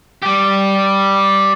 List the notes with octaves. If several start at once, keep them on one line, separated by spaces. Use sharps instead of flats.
G3 G4